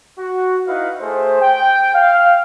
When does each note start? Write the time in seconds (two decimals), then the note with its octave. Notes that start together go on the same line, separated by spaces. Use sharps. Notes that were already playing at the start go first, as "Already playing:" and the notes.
0.18 F#4
0.67 D#4 E4 B4 F5 F#5
1.00 A3 G#4 C5
1.41 G5
1.94 F5